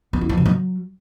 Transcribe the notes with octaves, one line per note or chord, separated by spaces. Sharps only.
B3
E4
F3
C3
F#3